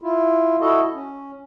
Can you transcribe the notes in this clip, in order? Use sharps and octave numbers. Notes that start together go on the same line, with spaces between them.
E4 F4
E4 F#4 A4 D#5
C#4